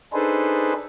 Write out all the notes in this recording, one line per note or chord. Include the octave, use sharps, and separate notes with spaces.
D4 D#4 G#4 A4 B4 C5